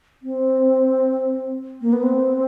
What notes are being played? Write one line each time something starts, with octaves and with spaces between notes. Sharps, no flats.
C4
A#3
B3
C4